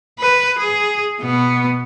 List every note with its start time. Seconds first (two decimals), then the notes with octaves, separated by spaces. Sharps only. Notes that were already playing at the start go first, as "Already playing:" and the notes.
0.19 B4
0.59 G#4
1.20 B2 B3